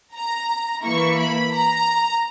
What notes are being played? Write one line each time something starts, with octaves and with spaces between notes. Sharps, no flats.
A#5
E3 A#3 E4 C#6
B5
A#5